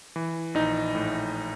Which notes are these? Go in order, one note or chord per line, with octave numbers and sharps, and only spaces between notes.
E3
A#1 D#4
A2